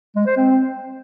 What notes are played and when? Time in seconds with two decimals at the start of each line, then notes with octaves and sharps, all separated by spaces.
0.16 G#3
0.26 C5
0.37 C4